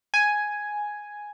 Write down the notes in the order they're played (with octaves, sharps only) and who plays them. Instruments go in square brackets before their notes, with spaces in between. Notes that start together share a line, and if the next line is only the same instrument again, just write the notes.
[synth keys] G#5